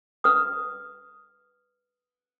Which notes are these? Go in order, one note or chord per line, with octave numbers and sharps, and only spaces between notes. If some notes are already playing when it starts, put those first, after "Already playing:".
B4 D#6